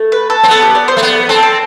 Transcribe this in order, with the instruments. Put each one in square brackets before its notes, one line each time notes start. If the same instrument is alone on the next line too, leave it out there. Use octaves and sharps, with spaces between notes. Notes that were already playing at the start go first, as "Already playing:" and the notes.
Already playing: [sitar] A3
[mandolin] B4
A4
[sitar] C4
[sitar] B3 [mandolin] A4
[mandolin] G4
D5
C5
[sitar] A3
[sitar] B3 [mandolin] D5
[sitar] C4 [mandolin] A4
[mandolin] A4